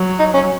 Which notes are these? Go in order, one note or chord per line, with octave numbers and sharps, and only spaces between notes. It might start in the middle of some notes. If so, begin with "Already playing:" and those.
Already playing: F#3
D#4
C#4